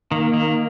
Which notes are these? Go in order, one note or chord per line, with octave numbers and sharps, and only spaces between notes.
D#3 A#3
D#3